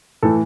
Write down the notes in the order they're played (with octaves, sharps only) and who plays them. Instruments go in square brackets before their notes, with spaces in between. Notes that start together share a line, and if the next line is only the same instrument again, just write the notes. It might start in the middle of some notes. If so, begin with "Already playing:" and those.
[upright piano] A2 E3 A4